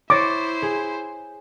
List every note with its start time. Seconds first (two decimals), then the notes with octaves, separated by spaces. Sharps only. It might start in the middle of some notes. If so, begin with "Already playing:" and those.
0.10 E4 C5 C#5 D6 A6 A#6
0.62 G#4